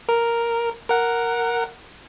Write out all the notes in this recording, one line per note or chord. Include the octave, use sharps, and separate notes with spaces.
A#4
A#4 F#5